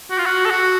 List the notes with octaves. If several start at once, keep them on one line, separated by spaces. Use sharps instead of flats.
F#4
F4
F#4
A4
F#4